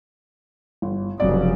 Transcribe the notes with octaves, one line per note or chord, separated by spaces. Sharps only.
G1
F1 C#3 F#3 D5